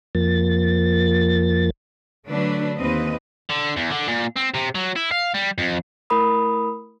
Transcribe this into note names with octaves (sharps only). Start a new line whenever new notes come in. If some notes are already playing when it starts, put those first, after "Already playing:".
F2 F3 A#3 A6
D3 F#3 A3 D4 B4
D#2 C4 B4 D#5
D3
E2
D3
A#2
C4
C3
F#3
E4
F5
G3
F2
A3 E4 A#4 B5 D#6